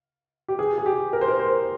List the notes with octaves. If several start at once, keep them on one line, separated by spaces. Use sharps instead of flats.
G4
G#4
G#4
G4
A#4
C5
A#4
C5